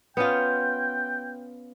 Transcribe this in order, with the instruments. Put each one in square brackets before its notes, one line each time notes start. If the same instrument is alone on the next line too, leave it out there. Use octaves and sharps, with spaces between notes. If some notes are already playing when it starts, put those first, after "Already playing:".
[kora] B3 C#4 F4 [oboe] G5